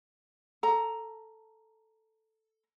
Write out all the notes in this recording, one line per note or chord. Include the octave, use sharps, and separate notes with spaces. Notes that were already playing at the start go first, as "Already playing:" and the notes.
A4 A#5